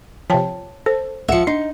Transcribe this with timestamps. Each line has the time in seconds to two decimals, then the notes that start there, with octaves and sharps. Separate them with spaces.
0.30 C3 F3 C#5 G5 A5
0.86 A4 C5
1.29 C#2 F3 E5 F#5 C#7
1.47 D4 D#4